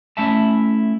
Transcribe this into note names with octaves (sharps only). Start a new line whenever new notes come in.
A3 C#4 E4 E5 A5